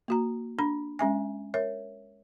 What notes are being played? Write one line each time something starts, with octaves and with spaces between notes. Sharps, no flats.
A#3 F#4 A#5
D4 B5
G#3 C#4 E5 G#5
A#4 C#5 E5